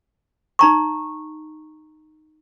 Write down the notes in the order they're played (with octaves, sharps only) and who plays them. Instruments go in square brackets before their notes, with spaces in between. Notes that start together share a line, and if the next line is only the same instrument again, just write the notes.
[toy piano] D#4 A#5 C#6